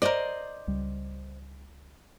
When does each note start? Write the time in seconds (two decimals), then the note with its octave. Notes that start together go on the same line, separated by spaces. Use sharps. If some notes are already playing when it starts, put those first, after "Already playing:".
0.02 A#4 C5 D5 D#5
0.67 C#2 G3